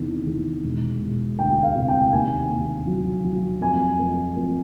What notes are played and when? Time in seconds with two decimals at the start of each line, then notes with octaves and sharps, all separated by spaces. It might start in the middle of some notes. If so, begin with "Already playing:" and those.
Already playing: E2 C3 D#3
0.26 E2
0.64 E1
1.01 E1
1.38 D2 G5
1.63 F5
1.76 C3
1.88 G5
2.12 D#2 G#5
2.50 D#2
2.87 F#3
3.24 F#3
3.61 F2 G#5
3.99 F2
4.37 F2